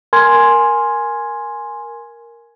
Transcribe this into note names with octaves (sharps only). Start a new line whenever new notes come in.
A#4 G#5 C6 G#6